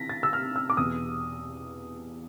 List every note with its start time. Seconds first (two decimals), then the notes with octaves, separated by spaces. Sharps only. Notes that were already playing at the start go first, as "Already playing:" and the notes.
Already playing: E3 A#6 B6
0.09 A6
0.23 E6
0.33 F6
0.56 E6
0.70 D6
0.77 E2 B2 D#6